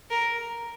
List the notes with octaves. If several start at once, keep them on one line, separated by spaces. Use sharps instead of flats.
A#4